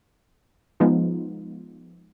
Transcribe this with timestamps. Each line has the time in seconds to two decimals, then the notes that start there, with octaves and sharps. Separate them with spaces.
0.80 F3 G#3 B3 D#4 F4